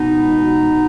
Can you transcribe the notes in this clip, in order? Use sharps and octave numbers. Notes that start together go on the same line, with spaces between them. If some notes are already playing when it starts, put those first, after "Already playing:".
Already playing: B2 B3 D#4
C#2
B2